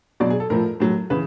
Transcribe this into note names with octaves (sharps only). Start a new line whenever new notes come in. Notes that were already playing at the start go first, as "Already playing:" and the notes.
B2 F#3 D5
G#4
A4
A2 F3 A#4
A2 F#3
C#3 E3 B4